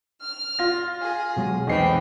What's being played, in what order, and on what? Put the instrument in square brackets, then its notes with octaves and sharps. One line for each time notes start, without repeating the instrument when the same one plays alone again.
[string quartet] F6
[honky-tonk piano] F4 A#6
[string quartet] G#4
[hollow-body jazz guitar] B2 F#3 G#3
[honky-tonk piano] B1 C7 [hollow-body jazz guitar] E2 D#5 [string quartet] B3 C4 G5